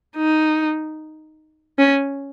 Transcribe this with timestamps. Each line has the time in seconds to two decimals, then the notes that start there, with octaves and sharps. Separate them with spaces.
0.16 D#4
1.78 C#4